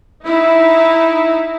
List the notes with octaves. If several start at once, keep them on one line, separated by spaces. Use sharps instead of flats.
D#4 E4